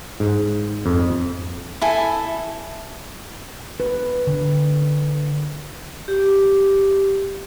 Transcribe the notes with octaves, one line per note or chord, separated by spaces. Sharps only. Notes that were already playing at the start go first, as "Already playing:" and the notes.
G#2
F2
E4 A4 G#5
B4
D3
G4